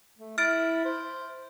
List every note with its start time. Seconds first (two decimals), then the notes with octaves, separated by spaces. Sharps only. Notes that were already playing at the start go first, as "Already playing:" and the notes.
0.18 A3
0.38 E4 F6 A6 D7
0.85 C5